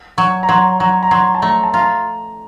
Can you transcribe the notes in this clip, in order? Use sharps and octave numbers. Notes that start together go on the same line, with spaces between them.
F#3 C#6
A#5
F#3 C6
F#3 A#5
A#5
F#3 C6
A5
A3 A#5
A5
F4 A#5